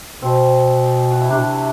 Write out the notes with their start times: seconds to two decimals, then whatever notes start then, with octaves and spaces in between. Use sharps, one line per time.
0.22 B2 C4
1.11 F#4
1.21 E4
1.29 C3 D4
1.37 B2
1.45 C3